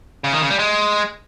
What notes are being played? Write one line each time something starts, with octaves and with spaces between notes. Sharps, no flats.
C#3
D#3
C#3
G3
G#3